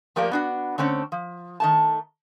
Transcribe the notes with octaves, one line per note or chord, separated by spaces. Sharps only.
F3 A3 A#3 G4 A#4 D5
B3 D4 F#4
D3 A3 C4 C#4
F3
D#3 A3 A5